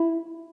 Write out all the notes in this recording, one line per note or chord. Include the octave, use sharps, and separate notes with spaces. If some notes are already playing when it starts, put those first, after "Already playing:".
Already playing: E4